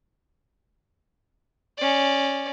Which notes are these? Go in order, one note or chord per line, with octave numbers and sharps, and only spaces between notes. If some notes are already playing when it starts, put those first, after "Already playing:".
C#4 D5